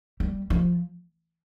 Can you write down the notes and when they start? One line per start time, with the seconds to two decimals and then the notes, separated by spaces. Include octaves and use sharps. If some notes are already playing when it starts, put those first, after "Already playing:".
0.20 G3
0.50 F3